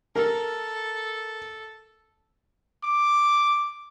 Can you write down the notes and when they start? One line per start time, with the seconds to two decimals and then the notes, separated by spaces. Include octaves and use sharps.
0.16 A4 A#4
2.83 D6